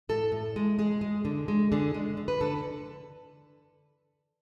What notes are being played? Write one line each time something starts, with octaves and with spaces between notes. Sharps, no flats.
A2 A4
A2
G#3
G#3 G#4
G#3
D3
G#3
D3 G#4
G#3
D3
B4
D3 A4